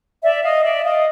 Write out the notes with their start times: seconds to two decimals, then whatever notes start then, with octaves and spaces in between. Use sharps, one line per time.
0.23 D5 E5
0.43 D#5 F5
0.63 D5 E5
0.84 D#5 F5